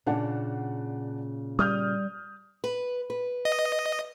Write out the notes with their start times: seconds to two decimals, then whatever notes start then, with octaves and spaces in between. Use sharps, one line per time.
0.07 A#2 C#3 D4 F#5 A5
1.59 G3 D#6 F6 G6
2.64 B4
3.10 B4
3.45 D#5